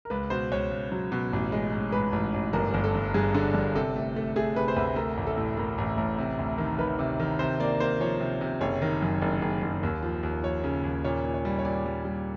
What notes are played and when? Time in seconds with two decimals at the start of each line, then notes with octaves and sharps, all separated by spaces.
0.05 A#4
0.10 C#2 B4
0.30 B2 C5
0.52 C#2 C#5
0.71 C#2
0.92 F#3
1.12 B2
1.33 A1
1.52 G#3
1.72 G#2
1.92 G#2 B4
2.13 A1
2.34 A1
2.53 G1 A#4
2.74 G1
2.84 A4
2.95 G2
3.14 G2 G#4
3.34 D3
3.55 G2
3.75 C3 A4
3.96 A3
4.16 A3
4.36 A3 G#4
4.56 C3 B4
4.68 C5
4.76 D2 B4
4.96 A3 A#4
5.17 A1
5.27 A4
5.38 A2
5.57 A2 A#4
5.78 A1
5.97 A1
6.18 C3
6.39 D2
6.58 D#3
6.78 D#3 B4
6.99 C3
7.20 D#3
7.39 C3 C5
7.60 A#3 D5
7.80 A#3 C5
8.00 F3 C#5
8.20 C3
8.41 C3
8.61 F#1 C#5
8.82 D#3
9.02 F#2
9.22 F#1
9.42 F#1
9.62 F#1
9.83 D#2
10.03 F3
10.23 D#2
10.43 F3 C#5
10.64 C#3
10.84 D#2
11.04 A#2 C#5
11.24 A#2
11.34 C#5
11.45 G3
11.59 C#5
11.65 A#2 D5
11.86 G3
12.05 G3